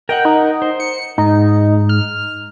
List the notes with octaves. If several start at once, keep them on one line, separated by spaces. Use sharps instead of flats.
A#4 D#5 F#5 G5
D#4
C5
C#7
G#2 D#4
F6